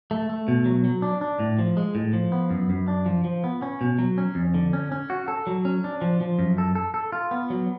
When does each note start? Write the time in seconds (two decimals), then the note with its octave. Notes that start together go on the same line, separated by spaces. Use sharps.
0.11 A3
0.29 A3
0.48 B2
0.65 F#3
0.85 F#3
1.02 D4
1.21 D4
1.39 A2
1.59 F3
1.77 G#3
1.95 A2
2.13 F3
2.32 B3
2.51 F#2
2.70 F#2
2.88 D4
3.06 F3
3.24 F3
3.44 B3
3.62 C#4
3.81 B2
3.99 F#3
4.18 C#4
4.35 F2
4.54 D3
4.73 C#4
4.92 C#4
5.10 F#4
5.28 A4
5.47 F#3
5.65 C#4
5.84 D4
6.02 F3
6.21 F3
6.39 F#2
6.58 A4
6.75 A4
6.94 A4
7.12 F4
7.31 B3
7.50 F#3